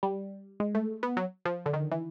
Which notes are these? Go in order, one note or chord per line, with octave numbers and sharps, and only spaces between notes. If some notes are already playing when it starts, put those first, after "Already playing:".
G3
G#3
A3
B3
F#3
F3
D3
D#3
E3